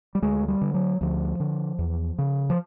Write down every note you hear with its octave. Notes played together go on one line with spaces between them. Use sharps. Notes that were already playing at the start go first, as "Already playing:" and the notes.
G3
D2 G#3
G3
D3
F#3
D2 F3
D3
E2
C#3
F3